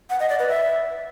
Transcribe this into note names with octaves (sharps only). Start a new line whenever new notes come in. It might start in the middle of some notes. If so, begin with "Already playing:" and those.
F#5
D#5
D5
B4
E5